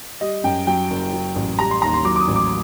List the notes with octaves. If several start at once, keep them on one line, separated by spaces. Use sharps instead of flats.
G3 D#5
F#2 G5
F#3 G5
F#1
F#3
A1
G3 A#5
C6
D#2 A#5
C6
F#3 D6
D6
D#6
A1
D6